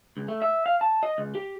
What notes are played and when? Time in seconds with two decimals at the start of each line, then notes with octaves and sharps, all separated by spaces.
0.17 C#2
0.28 A3
0.42 E5
0.66 F5
0.81 A5
1.03 D#5
1.18 C#2
1.35 G4